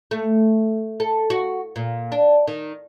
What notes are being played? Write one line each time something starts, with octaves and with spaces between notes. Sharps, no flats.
A3
A4
F#4
A#2
D4
D#3